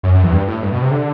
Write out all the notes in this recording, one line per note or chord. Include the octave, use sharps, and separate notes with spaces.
F#2
F#2
E2
G2
A2
G2
B2
C3
D3